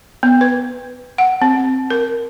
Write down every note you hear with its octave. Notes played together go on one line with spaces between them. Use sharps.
B3
B4
F#5
C4
A#4